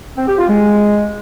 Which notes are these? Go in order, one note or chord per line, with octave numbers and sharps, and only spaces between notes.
C4
G4
F4
G#3